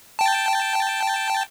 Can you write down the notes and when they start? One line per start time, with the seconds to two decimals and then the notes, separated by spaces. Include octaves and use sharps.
0.19 G5 A5